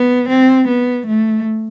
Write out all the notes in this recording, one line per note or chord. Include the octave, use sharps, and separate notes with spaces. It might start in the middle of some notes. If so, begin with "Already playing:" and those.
Already playing: B3
C4
B3
A3